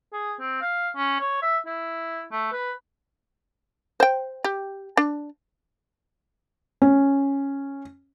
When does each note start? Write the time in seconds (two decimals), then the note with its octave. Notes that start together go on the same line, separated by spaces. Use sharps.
0.13 G#4
0.40 C4
0.61 F5
0.96 C#4
1.21 C#5
1.42 E5
1.66 E4
2.32 A3
2.53 B4
4.00 C5 G5
4.44 G4
4.97 D4
6.82 C#4